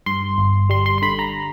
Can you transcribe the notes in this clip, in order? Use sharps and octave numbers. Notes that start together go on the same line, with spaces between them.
G2 C6
G1
G3 C6
C6
C6
D3 B5
A#5